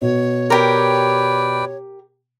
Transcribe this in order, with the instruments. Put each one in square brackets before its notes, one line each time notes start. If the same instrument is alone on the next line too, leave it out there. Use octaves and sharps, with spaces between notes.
[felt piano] B2 [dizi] C#5
[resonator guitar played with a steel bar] G4 A#4 [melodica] B4 D5 G5